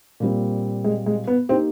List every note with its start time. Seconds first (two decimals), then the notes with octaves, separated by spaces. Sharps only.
0.20 A#2 G3 C4
0.84 G#3
1.06 G#3
1.27 B3
1.49 A#3 C4 D#4 G4